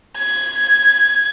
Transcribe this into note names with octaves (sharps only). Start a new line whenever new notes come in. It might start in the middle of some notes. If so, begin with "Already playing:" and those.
G#6